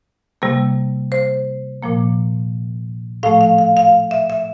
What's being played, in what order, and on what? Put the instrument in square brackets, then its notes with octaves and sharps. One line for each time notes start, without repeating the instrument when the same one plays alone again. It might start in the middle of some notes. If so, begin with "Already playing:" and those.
[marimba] C3 G3 A#3
C5
A#2 F3 A#3
A2 F3 A3 F5
F5
F5
F5
E5
E5